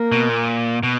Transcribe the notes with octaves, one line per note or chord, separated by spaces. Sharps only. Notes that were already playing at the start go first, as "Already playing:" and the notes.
Already playing: A#3
B2
A#2
B2